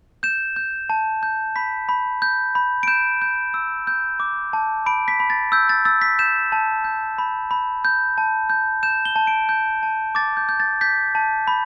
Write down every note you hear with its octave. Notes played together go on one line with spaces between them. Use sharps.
G6 E7
G6
A5
G6
B5 B6
B5
G6
B5
D7
G6 E7
G6
E6
G6
D6
A5
B5 D7
B6
B5
A6
E6 G6
A6
E6 A6
B6
G6 E7
A5
G6
B5
B5
G6
A5
G6
G6 E7
G7
A5
D7
G6
A5
D6 A6
G6
G6
A6
G6 B6
A5
B5